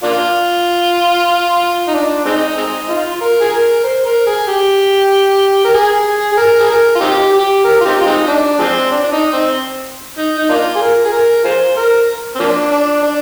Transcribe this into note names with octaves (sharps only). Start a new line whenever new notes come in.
A#3 D4 F4
D#4
D4
G#3 C4 D#4
G#3 C4 D#4
F4
A#4
G#4
A#4
C5
A#4
G#4
G4
A#4
G#4
G#4
A#4
G#4
A#4
F4
C4 D#4 G4
G4
A#4
F4
C4 D#4 G4
F4
G#3 C4 D#4
D4
F3 G#3 C4
D4
D4
D#4
C4
D#4
D#4
A#3 D4 F4
G#4
A#4
G#4
A#4
F4 G#4 C5
A#4
C4
F3 A#3 D4
D4
D4